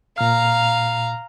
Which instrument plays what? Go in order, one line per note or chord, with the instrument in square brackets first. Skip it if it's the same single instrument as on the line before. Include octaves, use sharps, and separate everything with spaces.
[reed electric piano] A#2 F6 [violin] F5 A#5